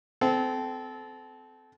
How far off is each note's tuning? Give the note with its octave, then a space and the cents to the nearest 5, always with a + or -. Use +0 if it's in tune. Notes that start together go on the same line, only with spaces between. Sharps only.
C4 -25 A4 -25